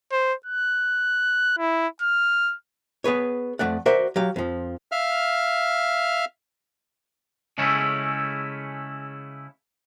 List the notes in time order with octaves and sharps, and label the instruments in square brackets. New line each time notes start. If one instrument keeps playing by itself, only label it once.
[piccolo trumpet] C5
F#6
E4
F6
[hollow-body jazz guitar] B3 G#4 B4 C#5
F2 A3 D5 F#5
F#4 A#4 C5 D5 E5 F#5
F#3 G4 F5
F2 F3
[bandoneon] E5 F5 F6
[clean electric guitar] C#3 G#3 A3 C#4 E4